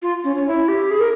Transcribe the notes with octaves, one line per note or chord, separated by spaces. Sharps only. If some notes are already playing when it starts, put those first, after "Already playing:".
F4
C#4
C#4
E4
G4
G#4
A#4